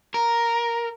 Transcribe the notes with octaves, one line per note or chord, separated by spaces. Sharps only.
A#4